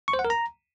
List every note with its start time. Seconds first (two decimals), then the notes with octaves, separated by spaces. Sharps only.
0.08 C#6
0.13 C5
0.19 F#5
0.25 A#4
0.30 A#5